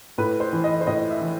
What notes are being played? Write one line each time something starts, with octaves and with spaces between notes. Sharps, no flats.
A2 B4
C5
E3
D#5
C5
A2 D#5
E5
E3